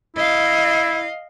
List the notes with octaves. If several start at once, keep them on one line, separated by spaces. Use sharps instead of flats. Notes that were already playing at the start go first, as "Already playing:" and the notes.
E4 D#5 F5